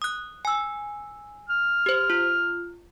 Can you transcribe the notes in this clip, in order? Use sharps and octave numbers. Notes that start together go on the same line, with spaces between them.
D#6 F#6
G#5 E6
F6
G4 C5
F4